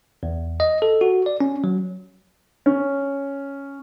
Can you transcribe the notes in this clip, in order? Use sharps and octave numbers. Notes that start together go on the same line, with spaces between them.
E2
D#5
A4
F#4
D5
C#4
F#3
C#4